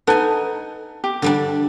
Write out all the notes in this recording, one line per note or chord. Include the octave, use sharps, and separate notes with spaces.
D#4 A4 B4 F#5 G#5
G4
D3 G3 D4